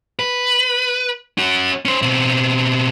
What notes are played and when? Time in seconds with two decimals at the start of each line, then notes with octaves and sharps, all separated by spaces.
0.19 B4
1.38 C#4 F#4
1.85 C#4 C5
2.02 B2 C4